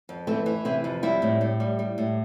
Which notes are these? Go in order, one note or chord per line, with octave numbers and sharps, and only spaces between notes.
F2
E3 A3 C4
E3
C3 C4 E4
F2
G3 C4 E4
A2
A2
G3
G3
A2